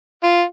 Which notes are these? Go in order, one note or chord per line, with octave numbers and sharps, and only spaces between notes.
F4